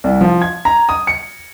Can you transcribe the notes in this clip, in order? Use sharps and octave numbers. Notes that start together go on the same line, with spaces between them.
C2
F3
G#6
A#5
D#6
C#7